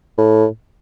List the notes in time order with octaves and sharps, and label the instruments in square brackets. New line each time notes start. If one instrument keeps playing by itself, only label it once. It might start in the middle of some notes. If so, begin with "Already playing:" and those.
[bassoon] A2